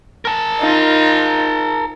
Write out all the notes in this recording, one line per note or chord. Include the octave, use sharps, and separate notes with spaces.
A#4 A5
D#4 F4